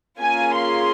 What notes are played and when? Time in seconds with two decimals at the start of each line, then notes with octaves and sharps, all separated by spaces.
0.19 A#3 C#4 F4 G#4 G#5
0.54 C6